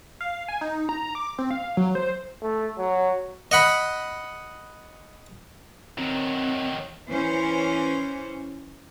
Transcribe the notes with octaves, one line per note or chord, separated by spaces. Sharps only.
F5
G#5
D#4
A#5
D6
C4
F5
F#3
C5
A3
F#3
D#5 F#5 B5
D#3 F#3 C4
E3 C#4 C5